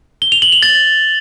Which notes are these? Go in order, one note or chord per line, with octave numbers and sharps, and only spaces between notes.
G7
F7
F#7
F7
A6